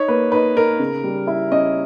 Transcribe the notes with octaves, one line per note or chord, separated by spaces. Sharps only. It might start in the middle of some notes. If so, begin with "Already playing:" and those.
Already playing: D#4 C#5
A#3 B4
D#4 B4
D#4 A#4
C#3
G3
E4
C#4 D#5